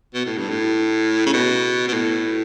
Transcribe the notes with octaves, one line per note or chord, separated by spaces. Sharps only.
B2
A2
G2
A2
C#3
B2
B2
A2